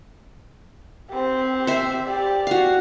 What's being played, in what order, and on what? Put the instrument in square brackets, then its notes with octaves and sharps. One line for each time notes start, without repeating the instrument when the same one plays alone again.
[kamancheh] C4 G4
[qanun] C5 E5
[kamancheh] G4 D5
[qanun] F#4 F5